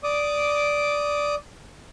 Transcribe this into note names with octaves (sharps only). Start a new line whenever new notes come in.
D5 D6 D#6